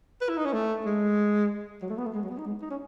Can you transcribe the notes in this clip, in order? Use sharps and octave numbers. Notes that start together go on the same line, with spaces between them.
B4
E4
D#4
C#4
A3
G#3
F#3
A3
B3
A3
G#3
F#3
B3
D#4
G#3
D#4
C#4